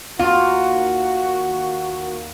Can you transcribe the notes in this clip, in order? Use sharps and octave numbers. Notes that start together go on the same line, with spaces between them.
D#2 A#3 F4 F#4